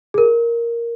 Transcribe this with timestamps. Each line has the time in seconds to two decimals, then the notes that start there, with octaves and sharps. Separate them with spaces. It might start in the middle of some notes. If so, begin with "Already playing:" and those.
0.14 G#4
0.18 A#4